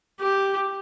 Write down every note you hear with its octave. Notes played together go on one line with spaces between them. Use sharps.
G4